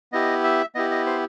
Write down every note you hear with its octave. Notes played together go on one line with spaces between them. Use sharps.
B3 E4 G4 D#5
E5
B3 E4 G4 D#5
D#5
C5